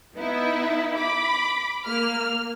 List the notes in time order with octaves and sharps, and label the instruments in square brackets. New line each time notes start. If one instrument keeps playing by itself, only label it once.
[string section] B3 D#4 E4 E5
B5 D6
A#3 F6